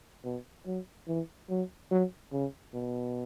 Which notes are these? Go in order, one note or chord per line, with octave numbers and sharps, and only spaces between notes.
B2
F#3
E3
F#3
F#3
C#3
B2